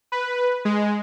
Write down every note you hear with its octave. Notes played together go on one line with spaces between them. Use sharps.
B4
G#3